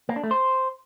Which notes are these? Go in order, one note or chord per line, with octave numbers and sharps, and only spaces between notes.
A#3
D4
A3
C5